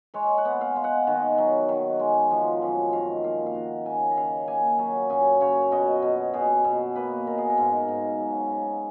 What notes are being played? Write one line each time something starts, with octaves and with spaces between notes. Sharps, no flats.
G#3 C#5
F#5
B3
F5
G#3
F#5
D#3
F#3
D#3
G#3
F3
F#2
D#3 F5
A#3 F5
F5
D#3 F#5
C#3 G#5
D#5
C#3 F5
A#3 G#5
F#3 G#5
F#2 G#5
C#3 C#5
B2 D#5
B2
B2 G#4
B2
A#3 B4
B2 A#4
G#4
A#4
G#2
G#2
F#3
C#3